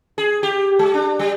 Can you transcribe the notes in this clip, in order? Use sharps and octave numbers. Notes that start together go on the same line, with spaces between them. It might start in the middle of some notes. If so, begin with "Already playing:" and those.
G#4
G4
G#3
D4
G3